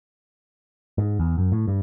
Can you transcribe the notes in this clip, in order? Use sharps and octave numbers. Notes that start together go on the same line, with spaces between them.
G#2
E2
F#2
A2
G2